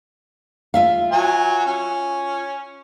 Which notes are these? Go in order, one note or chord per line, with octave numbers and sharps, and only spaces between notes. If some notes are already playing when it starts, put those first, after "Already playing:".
F4 E5 F5
F#3 G#5
C#4